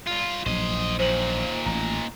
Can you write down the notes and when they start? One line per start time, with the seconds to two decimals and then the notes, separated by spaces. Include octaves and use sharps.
0.07 G2 F4
0.46 A#1 F#3 C5 D#5
0.99 D#2 A#2 C5 F#7
1.66 A1 A#5